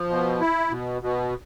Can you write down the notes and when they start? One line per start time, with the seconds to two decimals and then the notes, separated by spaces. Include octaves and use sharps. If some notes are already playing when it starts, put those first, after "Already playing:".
Already playing: F3
0.09 B2
0.40 E4
0.70 B2
1.02 B2